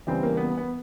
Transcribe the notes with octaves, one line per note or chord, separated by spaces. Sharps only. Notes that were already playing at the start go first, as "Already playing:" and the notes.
E2 C#3 E3 G3 C4
A#3
B3
B3